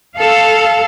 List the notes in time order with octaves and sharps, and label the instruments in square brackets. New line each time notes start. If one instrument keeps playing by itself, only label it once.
[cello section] A4 F5